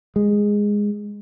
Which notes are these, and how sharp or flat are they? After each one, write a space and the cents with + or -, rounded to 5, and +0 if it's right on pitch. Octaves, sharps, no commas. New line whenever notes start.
G#3 -10